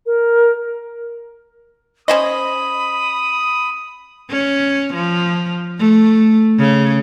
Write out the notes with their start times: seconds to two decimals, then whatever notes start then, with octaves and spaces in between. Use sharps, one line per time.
0.06 A#4
2.08 C#4 C5 D#5 B5 D#6
4.30 C#4
4.94 F3
5.79 A3
6.59 C#3